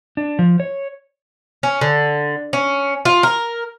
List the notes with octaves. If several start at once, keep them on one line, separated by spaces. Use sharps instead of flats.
D4
F3
C#5
C#4
D3
C#4
F4
A#4